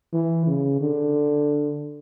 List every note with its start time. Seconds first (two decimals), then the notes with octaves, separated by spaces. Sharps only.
0.13 E3
0.47 C#3
0.81 D3